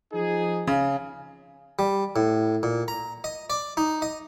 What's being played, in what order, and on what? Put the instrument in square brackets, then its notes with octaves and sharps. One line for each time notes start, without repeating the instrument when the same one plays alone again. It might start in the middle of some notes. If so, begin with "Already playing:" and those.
[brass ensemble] F3 D#4 G#4
[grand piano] C#3
[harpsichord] G3
A2
A#2
A#5
D#5
D5
D#4
D#5